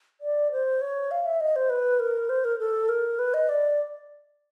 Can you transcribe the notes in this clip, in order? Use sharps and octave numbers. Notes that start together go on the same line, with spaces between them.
D5
C5
C#5
F5
E5
D#5
C5
B4
A#4
C5
A#4
A4
A#4
B4
D#5
D5